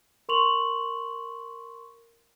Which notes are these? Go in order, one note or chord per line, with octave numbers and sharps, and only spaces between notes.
A#4 C6 C#6 F7 F#7